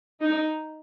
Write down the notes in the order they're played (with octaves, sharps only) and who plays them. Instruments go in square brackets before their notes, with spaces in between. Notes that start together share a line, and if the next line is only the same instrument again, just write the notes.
[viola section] D#4